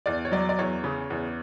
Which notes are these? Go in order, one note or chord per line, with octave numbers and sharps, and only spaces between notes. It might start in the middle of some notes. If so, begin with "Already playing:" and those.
E2 D5
C#5
F#3 D5
D5
E2 C#5
C#3
E2